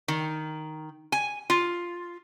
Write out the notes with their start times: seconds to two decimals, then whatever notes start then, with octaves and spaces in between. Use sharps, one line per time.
0.08 D#3
1.12 G#5
1.50 F4